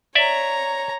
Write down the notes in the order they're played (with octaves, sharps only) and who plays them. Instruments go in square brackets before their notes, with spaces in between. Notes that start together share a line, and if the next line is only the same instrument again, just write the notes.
[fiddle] C#5 A#5 [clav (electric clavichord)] D5 E5